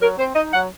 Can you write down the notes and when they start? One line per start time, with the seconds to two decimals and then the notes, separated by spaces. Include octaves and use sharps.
0.01 F#3 A#4
0.18 C4 C5
0.35 D#4 D#5
0.53 F#3 F#5